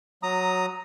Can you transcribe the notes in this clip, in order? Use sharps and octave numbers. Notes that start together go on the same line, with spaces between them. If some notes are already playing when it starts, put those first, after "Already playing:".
F#3 A#5 D#6